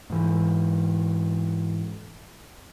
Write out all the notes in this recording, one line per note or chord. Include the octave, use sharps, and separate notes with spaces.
G#2 E3